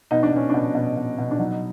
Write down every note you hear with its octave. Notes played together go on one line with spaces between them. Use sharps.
B2 D#4
D4
B2 C#4
B2 D4
B2
B2
B2
D4
F#3 D#4